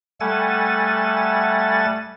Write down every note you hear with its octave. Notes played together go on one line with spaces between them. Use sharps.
G3 A3 A4 F#5 G#5 A6